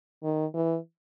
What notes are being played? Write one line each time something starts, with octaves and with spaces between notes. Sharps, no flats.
D#3
E3